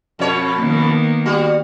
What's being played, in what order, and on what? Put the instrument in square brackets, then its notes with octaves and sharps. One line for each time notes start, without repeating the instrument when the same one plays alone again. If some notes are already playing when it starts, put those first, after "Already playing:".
[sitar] F2 B2 C#5
[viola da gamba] D#3 A#3 B3
[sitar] G3 F#4